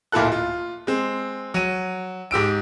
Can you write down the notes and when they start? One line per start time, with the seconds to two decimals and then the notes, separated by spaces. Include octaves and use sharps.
0.12 D1 A#2 E4 F4 A4 F#6
0.32 F4
0.87 G#3 C4
1.54 F#3 D#7
2.31 G#2 G4 E6 D7